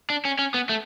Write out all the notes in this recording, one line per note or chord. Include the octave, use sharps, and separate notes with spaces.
D4
C#4
C#4
B3
A3